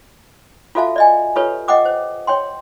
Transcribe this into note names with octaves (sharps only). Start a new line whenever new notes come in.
F4 F#4 A4 E5 F5 A5
D5 D#5 G#5
F4 G4 A4 B4 C#5
D#5 F#5 G5 D6 D#6
C5
C#5 G5 C6